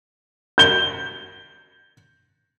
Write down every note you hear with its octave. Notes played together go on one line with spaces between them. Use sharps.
G6 G7